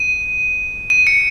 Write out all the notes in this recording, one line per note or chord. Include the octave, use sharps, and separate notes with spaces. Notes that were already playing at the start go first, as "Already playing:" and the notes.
Already playing: D#7
D#7
C#7